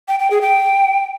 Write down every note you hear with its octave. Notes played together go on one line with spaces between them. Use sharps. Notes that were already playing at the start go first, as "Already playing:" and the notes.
G5
G5
G#4
G5